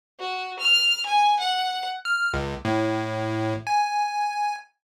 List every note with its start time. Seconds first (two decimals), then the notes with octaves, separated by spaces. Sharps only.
0.19 F#4
0.59 F6
1.06 G#5
1.39 F#5
2.05 F6
2.34 C#2
2.65 A2
3.67 G#5